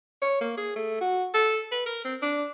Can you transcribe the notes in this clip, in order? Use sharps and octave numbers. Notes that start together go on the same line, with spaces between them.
C#5
A#3
G#4
A3
F#4
A4
B4
A#4
C4
D4